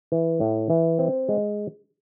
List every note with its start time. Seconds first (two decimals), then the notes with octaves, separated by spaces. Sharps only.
0.12 E3
0.40 A2
0.70 E3
0.99 C4
1.29 G#3